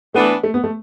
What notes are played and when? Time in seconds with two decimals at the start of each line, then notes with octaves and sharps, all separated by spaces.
0.14 E3 A3 B3 D4
0.43 A3
0.54 B3
0.64 A3